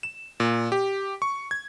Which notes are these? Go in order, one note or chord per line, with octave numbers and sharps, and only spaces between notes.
E7
A#2
G4
C#6
G#6